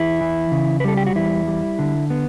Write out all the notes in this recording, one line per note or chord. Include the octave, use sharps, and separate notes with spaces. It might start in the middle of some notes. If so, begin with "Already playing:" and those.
Already playing: E2 E4
E3
C#3
B4
G3 A4
G4
F#4
E2 E4
G3
D3
B3